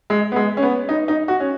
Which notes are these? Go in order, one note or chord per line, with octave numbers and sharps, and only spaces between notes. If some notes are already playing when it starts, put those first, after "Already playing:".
G#3
B3
G#3
C#4
B3
D#4
D#4
F#4
C#4